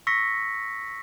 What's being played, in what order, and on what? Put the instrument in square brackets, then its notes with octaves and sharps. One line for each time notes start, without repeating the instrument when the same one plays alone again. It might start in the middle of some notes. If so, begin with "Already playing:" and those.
[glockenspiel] C#6 E6 A#6 B6 C#7